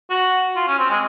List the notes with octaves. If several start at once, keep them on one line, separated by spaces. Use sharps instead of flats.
F#4
F4
C#4
C4
G#3